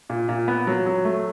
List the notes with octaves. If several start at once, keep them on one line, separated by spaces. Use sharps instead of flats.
A#2
A#2
B3
F#3
F#3
A3